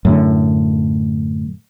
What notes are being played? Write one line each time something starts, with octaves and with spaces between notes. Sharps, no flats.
F#2 A2 D3